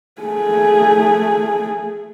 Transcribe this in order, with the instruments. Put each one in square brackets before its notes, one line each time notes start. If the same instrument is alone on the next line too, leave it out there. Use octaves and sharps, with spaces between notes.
[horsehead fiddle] A3 G#4